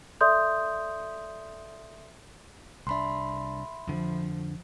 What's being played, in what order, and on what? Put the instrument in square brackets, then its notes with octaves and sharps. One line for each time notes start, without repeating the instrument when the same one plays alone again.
[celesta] A4 D5 E5 C6 D#6 G6
[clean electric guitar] C2 D4 [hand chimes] E5 B5 C6
[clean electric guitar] F2 D3 [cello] F3